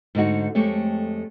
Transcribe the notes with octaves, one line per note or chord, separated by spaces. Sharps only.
G#2 D3 D#4 F#4
F2 G#3 A3 G4 C#5